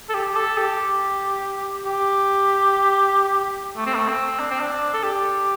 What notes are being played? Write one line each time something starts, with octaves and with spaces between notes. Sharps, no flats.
A4
G4
A4
G4
G4
A3
C4
A3
C4
D4
C4
D4
A4
G4